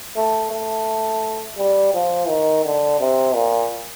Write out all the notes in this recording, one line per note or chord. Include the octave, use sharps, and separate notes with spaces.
A3
A3
G3
F3
D#3
D3
C3
A#2